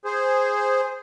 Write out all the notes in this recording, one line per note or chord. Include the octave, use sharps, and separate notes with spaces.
G#4 C5